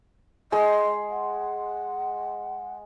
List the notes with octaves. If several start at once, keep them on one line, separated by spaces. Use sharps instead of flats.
G#3 D#5 C6
F#5